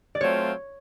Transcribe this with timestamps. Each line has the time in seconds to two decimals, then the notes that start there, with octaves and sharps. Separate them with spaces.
0.15 D5
0.21 F#3 A3 C4 F4 C#5